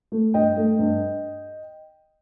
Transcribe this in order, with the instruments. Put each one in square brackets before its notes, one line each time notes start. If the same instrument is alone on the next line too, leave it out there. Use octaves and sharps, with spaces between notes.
[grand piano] A3
G2 D#5 G5
A3
G2